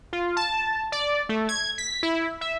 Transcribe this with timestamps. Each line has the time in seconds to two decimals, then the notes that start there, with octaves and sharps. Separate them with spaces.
0.13 F4
0.37 A5
0.92 D5
1.29 A3
1.49 G#6
1.78 B6
2.03 E4
2.41 E5